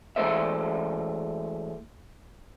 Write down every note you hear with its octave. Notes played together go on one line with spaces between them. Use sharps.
E3 G#3 A3 C5 E5